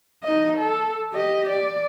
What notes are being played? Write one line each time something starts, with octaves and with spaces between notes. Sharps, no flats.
D#4 D#5
A4
G4 D#5
D5